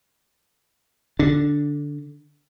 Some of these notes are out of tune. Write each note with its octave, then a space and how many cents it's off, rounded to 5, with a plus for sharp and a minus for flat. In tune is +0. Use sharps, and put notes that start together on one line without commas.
D3 +0 D4 -10